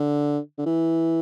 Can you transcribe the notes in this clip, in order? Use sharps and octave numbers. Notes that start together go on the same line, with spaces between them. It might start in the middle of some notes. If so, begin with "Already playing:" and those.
Already playing: D3
D3
E3